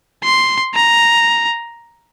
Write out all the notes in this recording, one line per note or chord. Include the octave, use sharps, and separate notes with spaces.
C6
A#5